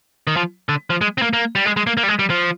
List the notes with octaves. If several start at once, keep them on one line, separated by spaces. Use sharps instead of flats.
D#3
F3
D3
F3
G#3
C4
A#3
A#3
G3
G#3
G#3
A#3
A#3
G3
G#3
G3
F3